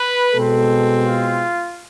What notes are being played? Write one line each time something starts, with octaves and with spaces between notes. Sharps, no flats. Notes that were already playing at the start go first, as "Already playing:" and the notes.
Already playing: B4
B2 G#3 C4 A4
F4